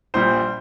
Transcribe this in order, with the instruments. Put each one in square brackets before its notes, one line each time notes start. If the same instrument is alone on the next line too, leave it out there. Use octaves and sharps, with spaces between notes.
[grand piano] A#1 A#2 G3 C5 C6